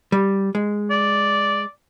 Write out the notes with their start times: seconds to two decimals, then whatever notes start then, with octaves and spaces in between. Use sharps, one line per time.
0.12 G3
0.55 G#3
0.90 D5